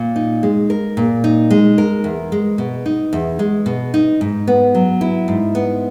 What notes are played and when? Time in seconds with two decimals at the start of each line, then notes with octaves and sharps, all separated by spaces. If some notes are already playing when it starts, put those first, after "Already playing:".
Already playing: A#2
0.16 D#4
0.43 G#3
0.70 A#4
0.97 A#2
1.24 D#4
1.50 G#3
1.78 A#4
2.04 E2
2.32 G#3
2.58 B2
2.86 D#4
3.13 E2
3.39 G#3
3.66 B2
3.94 D#4
4.21 G#2
4.47 B3
4.75 F#3
5.01 E4
5.28 G#2
5.55 B3